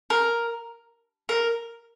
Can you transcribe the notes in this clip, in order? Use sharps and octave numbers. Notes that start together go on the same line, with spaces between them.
A#4
A#4